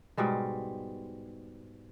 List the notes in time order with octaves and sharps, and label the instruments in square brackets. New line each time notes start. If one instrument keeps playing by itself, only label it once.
[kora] G#2 B2 G3 G#3